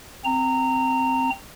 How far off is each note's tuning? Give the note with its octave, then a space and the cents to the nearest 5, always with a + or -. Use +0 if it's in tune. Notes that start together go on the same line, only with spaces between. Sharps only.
C4 -5 A#5 -20